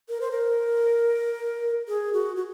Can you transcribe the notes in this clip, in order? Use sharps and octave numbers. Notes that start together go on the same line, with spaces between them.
A#4
C5
A#4
G#4
F#4
F#4